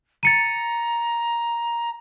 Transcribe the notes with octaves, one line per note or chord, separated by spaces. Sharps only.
A#5 A6 C#7 D#7